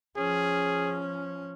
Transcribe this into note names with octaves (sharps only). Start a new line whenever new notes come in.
F3 C#4 G#4